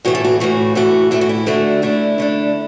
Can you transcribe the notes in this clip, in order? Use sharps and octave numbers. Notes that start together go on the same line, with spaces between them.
A2 E3 A3 F#4
A4
F#4
A2 E3 A3 F#4
A2 E3 A3 F#4
A2 E3 A3 E4
F#4
E4
D3 A3 D4 F#4
D3 A3 D4 E4
D3 A3 D4